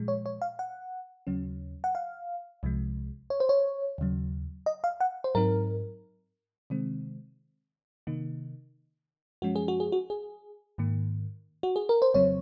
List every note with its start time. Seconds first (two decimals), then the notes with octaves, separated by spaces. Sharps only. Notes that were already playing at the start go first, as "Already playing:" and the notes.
Already playing: A#2 F3 G#3
0.08 C#5
0.26 C#5
0.42 F5
0.59 F#5
1.27 D#2 C#3 F#3 C#4
1.84 F#5
1.95 F5
2.63 C2 C3 F3 G#3
3.30 C#5
3.40 C5
3.49 C#5
3.98 D#2 C#3 F#3
4.66 D#5
4.84 F5
5.00 F#5
5.24 C5
5.35 G#2 F#3 C4 D#4 A#4
6.70 C3 D#3 G#3 C4
8.07 C3 D#3 A#3 D#4
9.42 F#2 F3 G#3 C#4 F#4
9.56 G#4
9.68 F#4
9.80 G#4
9.92 F#4
10.10 G#4
10.78 G#2 D#3 A#3
11.63 F#4
11.76 G#4
11.89 A#4
12.02 C5
12.14 F2 C#3 F#3 C4 C#5